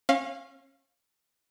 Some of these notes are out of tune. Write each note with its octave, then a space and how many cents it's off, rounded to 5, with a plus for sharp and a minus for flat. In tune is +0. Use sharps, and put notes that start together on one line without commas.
C#4 -30 F5 +0